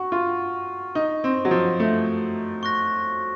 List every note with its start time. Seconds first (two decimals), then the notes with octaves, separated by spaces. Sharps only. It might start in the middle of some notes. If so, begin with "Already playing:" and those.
Already playing: F#4 C#6
0.12 F4
0.95 D#4
1.24 C4
1.45 F#3
1.51 F3
1.80 A3
2.63 C#6 F#6 A#6